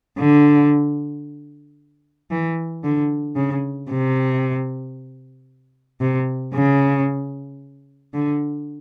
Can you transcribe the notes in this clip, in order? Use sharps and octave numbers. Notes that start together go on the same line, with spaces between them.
D3
E3
D3
C#3
C3
C3
C#3
D3